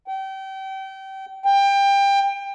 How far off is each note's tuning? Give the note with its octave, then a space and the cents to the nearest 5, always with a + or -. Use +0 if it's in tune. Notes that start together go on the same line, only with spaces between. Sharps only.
G5 -30
G5 +25